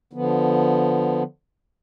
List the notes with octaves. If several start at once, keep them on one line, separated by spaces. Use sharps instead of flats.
D3 F3 B3